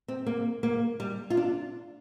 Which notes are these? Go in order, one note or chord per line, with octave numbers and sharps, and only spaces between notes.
C4
A#3
A#3
G3
F4
D4